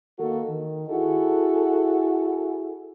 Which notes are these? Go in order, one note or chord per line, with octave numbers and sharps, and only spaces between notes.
D#3 A#3 F#4 A4
D#3
E4 F#4 G#4 A4